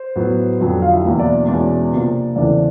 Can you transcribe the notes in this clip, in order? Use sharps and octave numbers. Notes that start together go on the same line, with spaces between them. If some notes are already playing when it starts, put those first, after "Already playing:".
Already playing: C5
A2 F#3 B3
F2 D3 F#3
F4 F5
E4 E5
E2 B2 F#3 A#3 E4 E5
D4 D5
E2 B2 G#3 C#4 D4 D5
C3 F3 A#3
E2 C#3 E3 A3 C4 D4 D5